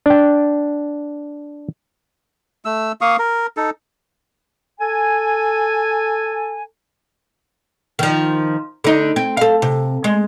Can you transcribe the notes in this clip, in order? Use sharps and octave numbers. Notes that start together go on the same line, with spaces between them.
D4 G5
A3 E6
A#3 F5 C#6 D#6
A#4
D#4 A4
A4 G#5
D#3 F3
D3 D#4
C4
A4 F5
C3
G#3